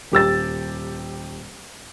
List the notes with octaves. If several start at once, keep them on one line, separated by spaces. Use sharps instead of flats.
D#1 G4 E6 A6